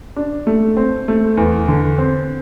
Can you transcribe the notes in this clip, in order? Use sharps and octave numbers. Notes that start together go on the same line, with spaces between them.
D4
A3
C4
A3
E2
D3
C4